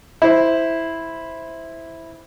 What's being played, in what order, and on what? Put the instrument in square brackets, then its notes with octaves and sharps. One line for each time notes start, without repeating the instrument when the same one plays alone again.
[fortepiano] E4 C5